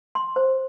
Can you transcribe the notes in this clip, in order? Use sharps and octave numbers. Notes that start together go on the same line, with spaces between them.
C6
C5